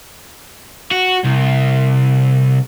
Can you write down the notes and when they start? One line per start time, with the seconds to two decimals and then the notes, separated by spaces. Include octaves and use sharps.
0.91 F#4
1.25 C2